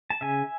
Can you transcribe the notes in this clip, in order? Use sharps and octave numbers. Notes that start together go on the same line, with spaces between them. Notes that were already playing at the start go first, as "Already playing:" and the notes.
A5
C#3 E5 G#5